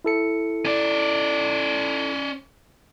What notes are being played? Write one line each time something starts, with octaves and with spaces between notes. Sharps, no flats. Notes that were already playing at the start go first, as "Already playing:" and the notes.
E4 A4 C#7
C#4 D5